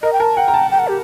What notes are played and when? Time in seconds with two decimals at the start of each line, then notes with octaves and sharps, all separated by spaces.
0.03 A#4 D#5
0.13 G5
0.20 A#4 A5
0.37 F#5 G5
0.48 A#5
0.54 A5
0.71 G5
0.79 F#5
0.88 G4